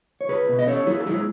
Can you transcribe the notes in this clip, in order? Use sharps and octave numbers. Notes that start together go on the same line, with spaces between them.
C#5
C#2 G#4 B4
B2
D#5
C#4 A4 C#5
F#3 E4 G#4
A4
G#3 E4 G#4